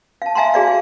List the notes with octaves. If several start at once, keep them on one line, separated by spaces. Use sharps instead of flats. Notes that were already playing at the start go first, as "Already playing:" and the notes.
F5 A5
E5 F5 G#5 A#5 C6
F#4 G#4 D5 F5
G#4 F5